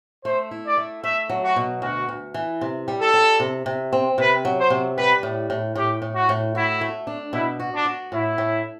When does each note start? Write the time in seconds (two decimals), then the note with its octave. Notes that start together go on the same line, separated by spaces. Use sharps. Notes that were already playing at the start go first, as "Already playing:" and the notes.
0.25 A3 C5
0.51 E4
0.64 D5
0.78 A3
1.03 A3 E5
1.30 F#3
1.43 F#4
1.56 B2
1.82 D2 F#4
2.09 D2
2.34 E3
2.61 C3
2.88 G3
3.00 A4
3.14 G3
3.40 C3
3.66 C3
3.93 C4
4.18 C3 B4
4.45 F#3
4.58 C5
4.70 C3
4.97 G3 B4
5.23 A2
5.50 A2
5.75 A2 G4
6.02 A2
6.15 F#4
6.29 A2
6.55 E4 F#4
6.81 A3
7.07 D4
7.33 B2 E4
7.60 F#4
7.73 D4
7.85 F#4
8.12 A2 E4
8.38 A2